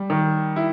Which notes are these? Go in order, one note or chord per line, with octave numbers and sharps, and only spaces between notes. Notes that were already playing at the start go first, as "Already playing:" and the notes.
Already playing: G3
D#3
E4